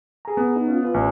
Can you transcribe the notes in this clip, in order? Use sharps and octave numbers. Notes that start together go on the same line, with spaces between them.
G#4 A#5
B3
D#4
C#4 F4
F4 B4
A1